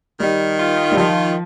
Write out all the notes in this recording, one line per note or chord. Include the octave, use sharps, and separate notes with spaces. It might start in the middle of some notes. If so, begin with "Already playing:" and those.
D#3 G3
F4
G3
D#3 F3